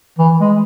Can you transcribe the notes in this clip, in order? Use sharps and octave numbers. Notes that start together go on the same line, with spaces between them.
E3
G#3